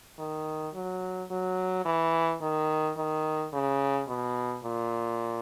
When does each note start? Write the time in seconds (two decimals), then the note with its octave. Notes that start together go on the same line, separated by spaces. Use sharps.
0.19 D#3
0.74 F#3
1.31 F#3
1.85 E3
2.42 D#3
2.97 D#3
3.53 C#3
4.09 B2
4.65 A#2